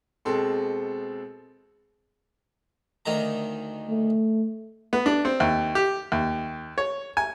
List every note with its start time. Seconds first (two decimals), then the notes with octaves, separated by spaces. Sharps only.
0.25 B2 G#3 C4 A4 C6
3.06 D2 D#3 A#5
3.89 A3
4.93 B3
5.06 D4
5.25 C4
5.40 D#2
5.75 G4
6.12 D#2
6.78 C#5
7.17 G#5